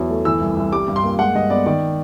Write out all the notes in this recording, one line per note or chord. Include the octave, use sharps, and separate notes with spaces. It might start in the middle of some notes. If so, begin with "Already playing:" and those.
Already playing: E2 F#3
A3
E3 E6
C2
C2
G3 D6
G2
C6
A#3
G#3 F#5
G2 D#5
B3 D5
D#3 D5